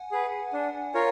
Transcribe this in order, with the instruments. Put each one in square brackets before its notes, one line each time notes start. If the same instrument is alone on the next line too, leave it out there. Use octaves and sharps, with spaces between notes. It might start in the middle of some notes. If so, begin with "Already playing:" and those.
Already playing: [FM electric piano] F#5 G#5
[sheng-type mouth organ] G#4 B4
D4
F4 A#4 C#5